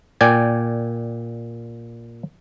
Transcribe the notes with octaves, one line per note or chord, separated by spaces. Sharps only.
A#2 D5 G5 G#5